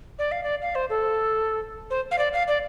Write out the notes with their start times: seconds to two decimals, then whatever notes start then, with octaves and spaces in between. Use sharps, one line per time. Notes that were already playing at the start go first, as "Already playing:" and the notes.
0.19 D5
0.31 F5
0.43 D5
0.62 F5
0.75 C5
0.90 A4
1.90 C5
2.11 F5
2.18 D5
2.33 F5
2.48 D5